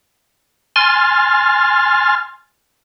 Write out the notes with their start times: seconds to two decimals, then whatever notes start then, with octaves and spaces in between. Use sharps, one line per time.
0.76 G#5 C6 F6 A6